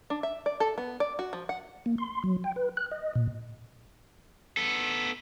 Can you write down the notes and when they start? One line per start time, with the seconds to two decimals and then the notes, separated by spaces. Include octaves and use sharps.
0.10 D4
0.23 E5
0.46 D5
0.60 A4
0.78 B3
1.00 D5
1.19 F#4
1.33 F3
1.49 F#5
1.86 A#3
1.98 C6
2.24 F#3
2.44 G5
2.56 B4
2.77 F#6
2.91 D#5
3.15 A#2
4.57 B3 A4